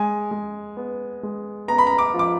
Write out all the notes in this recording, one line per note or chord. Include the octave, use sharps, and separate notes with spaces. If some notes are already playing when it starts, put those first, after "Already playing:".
Already playing: G#3 G#5
G#3
B3
G#3
B3 A#5
B5
A#5
D6
F3
D6